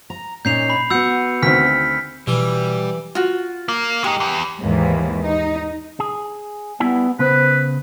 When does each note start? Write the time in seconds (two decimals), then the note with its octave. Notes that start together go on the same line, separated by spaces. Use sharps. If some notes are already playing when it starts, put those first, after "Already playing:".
0.10 A#5
0.45 A#2 C#4 D#4 G6 C7 F7
0.70 B5
0.90 B3 F#4 E6 G6 C#7
1.42 D2 D#3 C4 F6 B6
2.27 B2 E3 G3
3.15 F4 F#4
3.69 A#3
4.04 G#3 D#4 G4
4.20 E2
4.61 D#2 G#2 E3 A#3
5.23 D#4
6.00 G#4
6.80 G3 B3 E4 G#5
7.19 C#3 B3 B4 C5